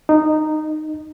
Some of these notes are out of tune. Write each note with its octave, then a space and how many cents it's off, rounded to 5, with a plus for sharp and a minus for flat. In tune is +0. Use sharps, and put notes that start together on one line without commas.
D#4 -15